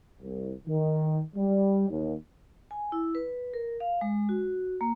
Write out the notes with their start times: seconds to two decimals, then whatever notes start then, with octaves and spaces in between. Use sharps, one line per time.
0.20 C2
0.68 D#3
1.36 G3
1.89 D#2
2.71 G#5
2.92 E4
3.15 B4
3.54 A#4
3.80 F5
4.01 G#3
4.29 F#4
4.81 A#3